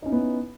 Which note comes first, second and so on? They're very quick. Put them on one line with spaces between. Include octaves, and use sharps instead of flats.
D#4 C#4 E4 B3